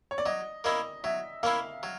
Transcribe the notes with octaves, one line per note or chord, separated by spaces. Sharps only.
C#5
D5
F#3 D#5
A#3 C#4 E4 D#5
F#3 E5
A#3 C#4 E4 F5
F#3